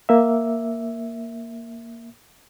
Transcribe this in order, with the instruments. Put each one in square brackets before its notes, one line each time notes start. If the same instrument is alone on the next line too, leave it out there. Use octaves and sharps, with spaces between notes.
[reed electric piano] A#3 E5